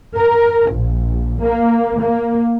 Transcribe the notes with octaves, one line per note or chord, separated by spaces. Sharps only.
A#4
A#1
A#3
A#3